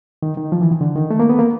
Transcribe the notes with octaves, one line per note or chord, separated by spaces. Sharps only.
D#3
D#3
F3
E3
D#3
D3
D#3
A3
A#3
B3
A#3